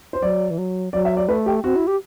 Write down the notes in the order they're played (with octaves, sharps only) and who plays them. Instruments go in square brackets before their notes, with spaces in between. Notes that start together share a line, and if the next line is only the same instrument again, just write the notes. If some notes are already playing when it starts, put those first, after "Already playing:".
[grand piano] C5
[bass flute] F#3 [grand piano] D5
[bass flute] E3
F#3
[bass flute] F#3 [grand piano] D5
[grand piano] E5
D5
[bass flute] A3 [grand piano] B4
[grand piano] G4
[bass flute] C4 [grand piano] F#4
[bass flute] E4
G4